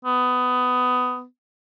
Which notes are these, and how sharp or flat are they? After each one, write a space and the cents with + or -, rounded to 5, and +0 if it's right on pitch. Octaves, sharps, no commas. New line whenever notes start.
B3 +20